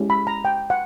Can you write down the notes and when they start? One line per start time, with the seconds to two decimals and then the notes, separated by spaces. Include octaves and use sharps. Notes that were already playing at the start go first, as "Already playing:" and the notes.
Already playing: G#3 C#4 E4 G4
0.10 B5
0.27 A#5
0.45 G5
0.70 F#5